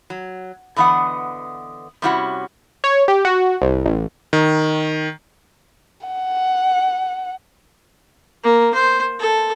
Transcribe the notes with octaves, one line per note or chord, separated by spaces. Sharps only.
F#3
D3 E3 B3 D#5 F#5
C3 G3 C#4 E4 F#4 F#5
C#5
G4
F#4
C2
A1
D#3
F#5
A#3
C5
A4